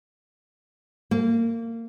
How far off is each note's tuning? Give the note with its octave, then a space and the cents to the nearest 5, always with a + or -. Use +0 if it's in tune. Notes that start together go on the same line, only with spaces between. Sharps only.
A#3 -25